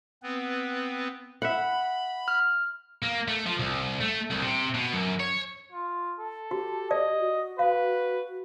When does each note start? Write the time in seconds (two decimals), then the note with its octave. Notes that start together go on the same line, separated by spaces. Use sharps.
0.23 B3 C4 B4
1.42 E5 F#5 B5
2.28 F6
3.02 A#3
3.28 A3
3.46 F3
3.59 C2
4.00 A3
4.30 C2
4.42 C3
4.74 B2
4.93 F#2
5.20 C#5
5.72 F4
6.20 A4
6.51 F#4 G4
6.91 D5 D#5
7.20 F#4
7.59 B4 F5